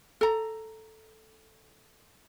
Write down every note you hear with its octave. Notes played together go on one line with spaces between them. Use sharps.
A4 A#5